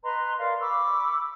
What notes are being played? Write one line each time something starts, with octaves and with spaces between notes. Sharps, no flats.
B4 D#5 A#5 C6
A#4 D5 F5
B5 C#6 D6 E6